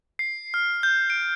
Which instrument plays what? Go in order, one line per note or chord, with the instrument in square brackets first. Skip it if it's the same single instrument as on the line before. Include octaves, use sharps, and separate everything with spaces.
[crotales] C7
F6
G6
D7